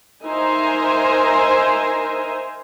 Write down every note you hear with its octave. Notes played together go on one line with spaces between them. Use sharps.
D#4 A#4 C5 E5 G#5 A#5